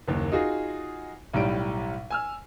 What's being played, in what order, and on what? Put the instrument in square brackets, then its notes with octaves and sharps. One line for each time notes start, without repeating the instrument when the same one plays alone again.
[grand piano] F#1 D#2
D#4 F4 F#4 G#4
B1 A2 G3 D7
G#5 E6 F6